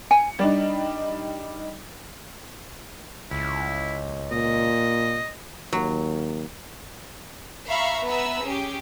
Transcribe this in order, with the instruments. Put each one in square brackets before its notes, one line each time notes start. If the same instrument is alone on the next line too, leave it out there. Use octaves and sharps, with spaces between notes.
[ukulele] G#5 [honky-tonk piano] C#7
[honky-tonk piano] G3 D4 D#4 [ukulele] D5
[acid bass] C#2 [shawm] E4
[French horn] A#2 [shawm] D#5
[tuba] D#2 [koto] F#3
[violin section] E5 F5 A#5 B5 C#6
B3 B4 E5 A#5 E6
C#4 G4 G#4